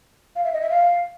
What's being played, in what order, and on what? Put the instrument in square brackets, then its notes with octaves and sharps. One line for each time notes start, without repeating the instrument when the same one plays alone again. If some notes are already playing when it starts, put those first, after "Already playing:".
[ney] F5
E5
D#5
E5
F5